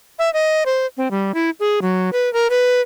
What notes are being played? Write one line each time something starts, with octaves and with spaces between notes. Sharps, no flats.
E5
D#5
C5
C4
G3
E4
G#4
F#3
B4
A#4
B4